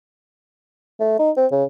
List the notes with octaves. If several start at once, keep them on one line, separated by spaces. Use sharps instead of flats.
A3
D#4
C4
C#3